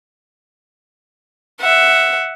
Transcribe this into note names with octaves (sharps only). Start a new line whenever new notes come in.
E5 F#5